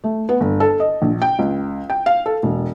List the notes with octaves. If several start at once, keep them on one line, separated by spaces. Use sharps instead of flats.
A3
B3
G1
A4
D#5
A#1
G5
C#2
G5
F5
A4
E1